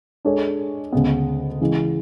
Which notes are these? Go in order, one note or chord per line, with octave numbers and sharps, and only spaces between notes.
G#3 D4 A4 C#5
D2 C#3 G#3 B3
C#3 E3 G#3